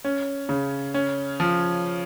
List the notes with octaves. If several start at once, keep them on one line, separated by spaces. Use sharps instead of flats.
C#4
C#3
C#4
F3